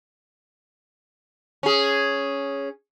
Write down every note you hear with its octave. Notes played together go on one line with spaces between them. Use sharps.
C#4 G#4